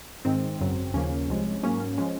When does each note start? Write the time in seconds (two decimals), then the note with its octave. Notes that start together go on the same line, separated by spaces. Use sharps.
0.25 G#2 D#3 G#3 C4
0.60 G#1 F#2 C#3 F#3
0.94 D#2 C#3 F3 A#3 C#4
1.28 C2 C3 F3 G#3
1.63 G#2 F#3 A#3 C#4
1.80 C#4
1.98 F3 G#3 C#4